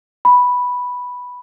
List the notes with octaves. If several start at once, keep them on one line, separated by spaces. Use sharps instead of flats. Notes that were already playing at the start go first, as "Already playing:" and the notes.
B5